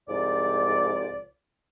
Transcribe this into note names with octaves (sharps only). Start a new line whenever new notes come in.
C2 G#2 F3 D5